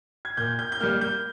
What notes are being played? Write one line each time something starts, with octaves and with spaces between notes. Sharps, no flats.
G#6
A#2 G6
G6
G6
G3 A#3 F6
G6